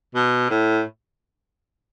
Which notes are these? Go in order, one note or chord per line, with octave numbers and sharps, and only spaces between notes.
B2
A2